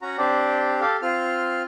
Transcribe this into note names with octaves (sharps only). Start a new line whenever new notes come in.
C#4 F#4 A#5
C4 D4 G4 D5
G4 A4 F5
C4 F4 F6